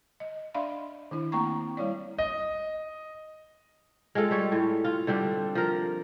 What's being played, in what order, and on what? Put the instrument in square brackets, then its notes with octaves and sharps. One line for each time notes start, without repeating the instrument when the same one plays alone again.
[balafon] D#5
D4 D5 E5 F5 B5 C6
D#3 D4 E4
A3 A#3 C4 G5 A#5 C#6
G3 E4 C#5 D5
[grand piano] D#5
[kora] G#3 C4 F4 A4
G3 C#5
A2
F4
D3 G3 C4 D4
F3 A#4